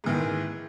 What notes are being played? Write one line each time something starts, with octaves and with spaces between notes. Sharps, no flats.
G#2 D#3 E3